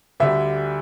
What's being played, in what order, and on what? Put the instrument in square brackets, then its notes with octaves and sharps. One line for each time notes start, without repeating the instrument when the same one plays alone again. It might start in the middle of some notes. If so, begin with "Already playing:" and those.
[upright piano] D2 D3 G3 E5